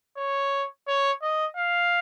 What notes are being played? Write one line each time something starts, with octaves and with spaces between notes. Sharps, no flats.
C#5
C#5
D#5
F5